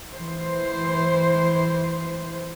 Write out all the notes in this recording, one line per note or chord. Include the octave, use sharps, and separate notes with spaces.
E3 C5